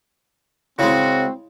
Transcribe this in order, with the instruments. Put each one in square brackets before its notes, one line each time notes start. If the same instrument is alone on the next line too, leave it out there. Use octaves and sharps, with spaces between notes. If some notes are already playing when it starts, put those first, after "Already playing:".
[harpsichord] C#3 G#3 [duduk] C4 [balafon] E4 C#5 G5 [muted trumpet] F#4